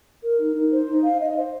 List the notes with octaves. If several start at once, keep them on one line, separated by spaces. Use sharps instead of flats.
A#4
D#4
D#4
C5
D#4
F5
D#5
C5